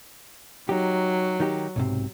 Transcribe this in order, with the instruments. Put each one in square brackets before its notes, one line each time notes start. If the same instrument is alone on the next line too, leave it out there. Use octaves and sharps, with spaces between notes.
[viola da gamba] F#3 [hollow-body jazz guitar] D#4 G4
[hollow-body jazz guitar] D#3 D#4 G4
B1 G#2 C3